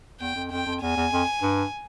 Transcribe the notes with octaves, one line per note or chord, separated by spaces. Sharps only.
E2 G5
F2
F2 G5
F2
E2 G#5
E2
F2
G2